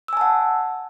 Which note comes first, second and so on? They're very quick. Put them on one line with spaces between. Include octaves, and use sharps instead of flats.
E6 G#5 A5 F#5